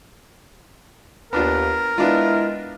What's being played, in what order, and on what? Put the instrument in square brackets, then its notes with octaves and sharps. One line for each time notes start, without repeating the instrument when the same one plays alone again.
[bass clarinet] D#2 [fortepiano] B3 D4 F4 [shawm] A#4
[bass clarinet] G#3 [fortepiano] B3 D4 F4 [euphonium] E4